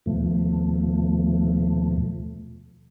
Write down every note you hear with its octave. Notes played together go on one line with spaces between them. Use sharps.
D#2 B2 F3 A3